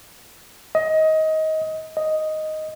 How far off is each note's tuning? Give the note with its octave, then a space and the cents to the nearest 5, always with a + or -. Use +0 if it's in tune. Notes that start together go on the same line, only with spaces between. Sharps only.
D#5 +20
D#5 +0